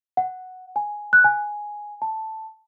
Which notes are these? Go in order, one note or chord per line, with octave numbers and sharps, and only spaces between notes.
F#5
G#5
F#6
G#5
A5